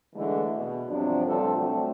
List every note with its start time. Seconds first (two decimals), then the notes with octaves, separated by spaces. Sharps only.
0.15 D3 E3 G#3 A3 E4
0.55 B2
0.88 G2 C3 F3 F#3 D4
1.26 D2 G2 C3 F3 A4
1.55 F#3 A3 C4 D4